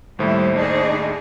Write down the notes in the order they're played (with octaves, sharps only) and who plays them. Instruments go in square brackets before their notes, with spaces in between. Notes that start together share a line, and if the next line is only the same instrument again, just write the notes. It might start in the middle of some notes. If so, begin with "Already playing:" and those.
[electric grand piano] D#2 A2 [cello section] G3 E4 [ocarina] C5
[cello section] D4 D#4 G#4